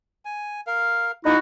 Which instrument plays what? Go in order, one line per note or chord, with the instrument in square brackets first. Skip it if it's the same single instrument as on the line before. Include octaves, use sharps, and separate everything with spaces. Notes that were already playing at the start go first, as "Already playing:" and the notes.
[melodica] G#5
A#4 F5
[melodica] A#3 [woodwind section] D#4 E4 F#4